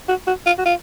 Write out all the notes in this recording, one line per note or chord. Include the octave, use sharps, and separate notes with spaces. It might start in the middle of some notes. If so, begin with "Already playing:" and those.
F#4
F#4
F4
F#4
F4